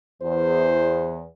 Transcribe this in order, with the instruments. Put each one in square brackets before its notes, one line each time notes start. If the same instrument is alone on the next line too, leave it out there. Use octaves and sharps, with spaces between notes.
[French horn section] E2 [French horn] C5